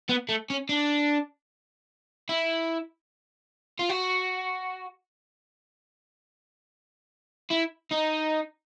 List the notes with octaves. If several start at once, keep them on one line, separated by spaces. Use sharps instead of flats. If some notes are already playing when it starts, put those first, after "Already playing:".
B3
A3
C#4
D4
E4
F4
F#4
E4
D#4